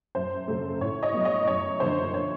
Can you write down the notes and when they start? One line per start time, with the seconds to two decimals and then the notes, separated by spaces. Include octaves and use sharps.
0.15 F#2 C5
0.48 C#3 F#3 A3
0.81 A2 C#5
1.03 C#5 D#5
1.14 F#3 B3
1.25 C#5 D#5
1.47 F#2 C#5
1.80 D3 F3 A#3 C5
2.14 C#5